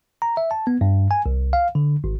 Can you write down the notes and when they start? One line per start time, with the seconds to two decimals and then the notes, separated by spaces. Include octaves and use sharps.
0.22 A#5
0.37 E5
0.51 A5
0.67 B3
0.81 G2
1.11 G#5
1.26 C2
1.53 F5
1.75 D3
2.04 G#1